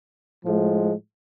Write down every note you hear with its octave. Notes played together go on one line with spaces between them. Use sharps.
A2 F3 G#3